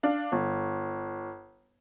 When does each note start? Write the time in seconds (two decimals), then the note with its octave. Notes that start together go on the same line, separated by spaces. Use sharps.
0.03 D4 F5
0.32 G1